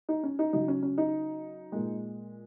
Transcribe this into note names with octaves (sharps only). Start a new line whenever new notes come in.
D#4
C#4
D#4
C#3 F#3 D#4
C#4
C#4
D#4
A#2 G#3